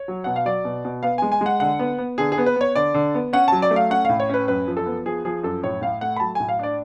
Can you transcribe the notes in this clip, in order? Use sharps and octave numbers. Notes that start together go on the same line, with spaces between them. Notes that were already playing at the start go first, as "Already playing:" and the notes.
Already playing: C#5
F#3
B2 F#5
F5
F#3 D5
B2
B2
B3 F5
G#3 G#5
G#5
G#3 F#5
D3 F#5
B3
B3
D3 G#4
G#4
B3
B4
B3 C#5
D3 D5
D3
B3
C#4 F#5
F#3 A5
D5
A3
F5
C#4 F#5
A2 F5
C#5
C#4 B4
F#2 B4
F3
A4
B3
F3 G#4
F3 G#4
F#2 A4
A2 C#5
A2 F5
A3 F#5
B5
F#3 A5
A2 G#5
F5
D4 D5